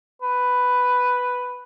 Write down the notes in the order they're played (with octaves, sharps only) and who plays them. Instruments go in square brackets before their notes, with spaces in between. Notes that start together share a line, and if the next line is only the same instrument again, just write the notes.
[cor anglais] B4